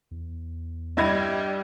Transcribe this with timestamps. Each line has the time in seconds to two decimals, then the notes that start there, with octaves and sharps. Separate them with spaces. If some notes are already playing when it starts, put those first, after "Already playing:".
0.11 E2
0.97 G2 G3 E4 D#5 E5 B5 G#6